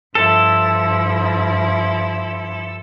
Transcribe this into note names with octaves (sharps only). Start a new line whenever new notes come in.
G2 F3 E4 A4